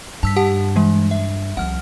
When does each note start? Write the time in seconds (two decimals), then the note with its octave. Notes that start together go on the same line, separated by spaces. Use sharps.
0.23 G2 A5 E6 B6
0.36 G4 F#5 A5
0.76 E3 G#3
1.11 E5
1.57 C2 F3 F#5 F6